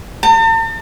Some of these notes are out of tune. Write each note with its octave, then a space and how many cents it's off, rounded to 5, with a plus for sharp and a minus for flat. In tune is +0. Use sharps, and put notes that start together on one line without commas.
A5 +45